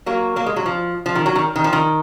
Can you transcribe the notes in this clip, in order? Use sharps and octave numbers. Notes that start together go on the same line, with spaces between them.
F#3 A#3
F#3 A#3
G#3
F#3
F3
F3
D#3
F#3
D#3
D#3
F3
D#3